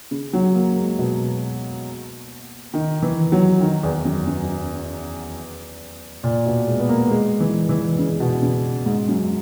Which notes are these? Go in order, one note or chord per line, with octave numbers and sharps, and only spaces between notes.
C#3
F#3
A#3
G#3
B2
D#3
E3
F#3
D#3
E2
F#2
F#2
A#2
B2
G#3
B3
A#3
G#3
E3
E3
C#3
B2
C#3
G#2
F#2